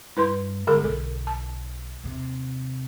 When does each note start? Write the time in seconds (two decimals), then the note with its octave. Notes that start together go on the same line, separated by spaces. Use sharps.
0.17 G2 E4 B4 C6
0.67 G1 G#2 D3 G#4 A#4
0.84 B1 A4
1.27 A5
2.03 D#2 C3